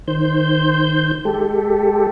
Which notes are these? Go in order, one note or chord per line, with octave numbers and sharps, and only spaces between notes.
D#3 C5 G6
G#3 G4 A4